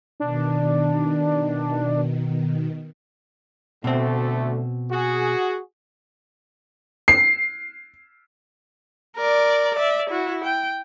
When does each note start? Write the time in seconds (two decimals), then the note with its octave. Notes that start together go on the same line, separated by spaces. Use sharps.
0.20 B2 D#3 D4
3.84 D2 B2 D3 A3 C4
4.91 F#4 G#4
7.08 C7
9.17 A#4 D5
9.76 D5 E5
10.10 E4 F#4
10.44 G5